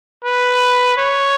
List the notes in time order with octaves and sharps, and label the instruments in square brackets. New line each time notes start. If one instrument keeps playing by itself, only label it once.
[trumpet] B4
C#5